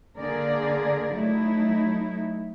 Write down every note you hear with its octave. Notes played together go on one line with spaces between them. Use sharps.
D3 A#3 G#4 A#4 D5
F#3 A3 D#4 E4